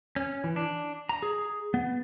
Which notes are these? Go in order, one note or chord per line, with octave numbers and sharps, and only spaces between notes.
C#4
E3
D4
A#5
G#4
B3